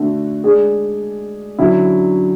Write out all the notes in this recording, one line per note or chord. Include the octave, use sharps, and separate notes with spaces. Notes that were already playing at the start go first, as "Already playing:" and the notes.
Already playing: D3 A3 D4 F#4
G#3 D4 G#4 D5
D3 F#3 C#4 E4